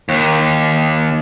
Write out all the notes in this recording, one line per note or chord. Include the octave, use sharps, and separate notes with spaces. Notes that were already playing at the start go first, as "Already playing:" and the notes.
D#2